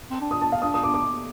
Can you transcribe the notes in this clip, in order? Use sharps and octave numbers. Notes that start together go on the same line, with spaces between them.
C4
D4
D#6
A5
F5
D4 D#6
D#6
D6
D6